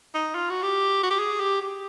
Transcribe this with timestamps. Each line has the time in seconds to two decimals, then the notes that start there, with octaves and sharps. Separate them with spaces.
0.14 D#4
0.35 F4
0.50 F#4
0.63 G4
1.03 F#4
1.11 G4
1.19 G#4
1.40 G4
1.61 G4